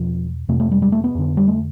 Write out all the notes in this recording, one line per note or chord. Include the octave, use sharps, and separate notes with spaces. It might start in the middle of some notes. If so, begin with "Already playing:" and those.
Already playing: E2 B2 F3
F2 C3 A3
A3
G3
G3
A3
B3
F2 D3
G3
A3